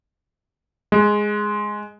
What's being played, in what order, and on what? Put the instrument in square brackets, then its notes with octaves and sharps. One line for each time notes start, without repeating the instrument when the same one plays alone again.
[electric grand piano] G#3